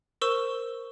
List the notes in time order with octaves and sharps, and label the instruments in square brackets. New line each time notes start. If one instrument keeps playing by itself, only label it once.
[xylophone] A#4 C5 C#6 E6 E7